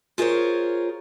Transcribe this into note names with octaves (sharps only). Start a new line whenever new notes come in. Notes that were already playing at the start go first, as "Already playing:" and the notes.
F4 G#4 A#4 C5 C#5